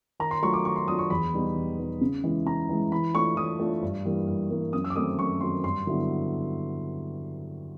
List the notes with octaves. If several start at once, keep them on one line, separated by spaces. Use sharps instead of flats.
D#3 A#5
C6
F#3 A3 D4 F4 C#6
D6
D#3 C#6
C6
F#3 A3 D4 F4 D#6
C#6
E2 B5
B2 G3 B3 D#4
E2
B2 G3 B3 D#4
C#3
E3 G#3
C#3 A#5
E3 G#3
E3 B5
A3 D4 F4 C#6
E3 D#6
A3 D4 F4
G2
E3 G3 A#3
G2
E3 G3 A#3
F#2 D#6
E6
D6
D#3 F#3 A3 C4 D#6
F#2 C#6
D#3 F#3 A3 C4 C6
G2 C6
D3 F#3 B3 E4